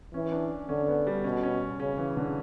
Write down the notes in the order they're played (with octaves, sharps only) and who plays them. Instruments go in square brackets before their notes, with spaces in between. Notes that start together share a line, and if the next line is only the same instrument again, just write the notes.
[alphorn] E3 [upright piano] C#4
[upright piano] D4
[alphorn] D3 [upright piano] C#4
[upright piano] B3
G3
[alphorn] B2 [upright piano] C#4
[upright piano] C#4
[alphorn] C#3 [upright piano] C#4
[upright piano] E3
D3